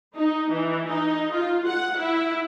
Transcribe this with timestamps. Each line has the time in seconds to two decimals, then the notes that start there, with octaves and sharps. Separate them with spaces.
0.16 D#4
0.51 E3
0.88 D#4
1.32 F4
1.67 F#5
1.99 E4